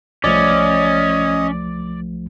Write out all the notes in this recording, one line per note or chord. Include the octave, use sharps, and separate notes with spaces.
C2 F3 A3 C#4 D5 D#5